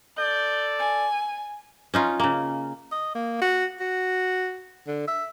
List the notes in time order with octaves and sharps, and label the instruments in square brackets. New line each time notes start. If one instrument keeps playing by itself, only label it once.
[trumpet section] A4 D5 [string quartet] G6
[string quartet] G#5
[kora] C#4 D#4 F4
C#3 A#3
[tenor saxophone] D#5
A#3
F#4
F#4
D3
E5